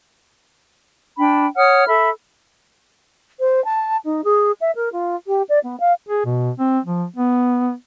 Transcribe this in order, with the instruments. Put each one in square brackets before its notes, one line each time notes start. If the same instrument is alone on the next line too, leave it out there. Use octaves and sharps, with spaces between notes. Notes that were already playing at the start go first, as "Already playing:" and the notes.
[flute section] D4 G5 B5
C#5 F#5 D#6 F6
A4 E5 B5
[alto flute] C5
A5
D#4
G#4
E5
A#4
F4
G4
D5
B3
F5
[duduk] G#4
B2
C4
F3
B3